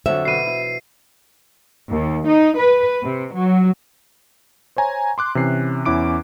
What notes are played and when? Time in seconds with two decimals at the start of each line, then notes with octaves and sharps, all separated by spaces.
0.06 F2 D3 F#3 E5
0.25 B2 E3 B4 C7 D#7
0.46 E4
1.91 D#2
2.27 D#4
2.57 B4
3.02 C3
3.34 F#3
4.76 C5 C#5 G#5 A#5
5.18 C6 D6 F#6
5.35 C3 E3 C#4 C7
5.85 E2 C#4 E4 D6 D7